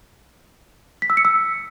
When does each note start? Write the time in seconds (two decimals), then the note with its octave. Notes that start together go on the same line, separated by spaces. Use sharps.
1.02 B6
1.10 E6
1.17 C#7
1.25 E6